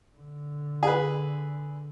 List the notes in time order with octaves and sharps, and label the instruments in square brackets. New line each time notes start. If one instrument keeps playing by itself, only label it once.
[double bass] D3
[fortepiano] G#4 B4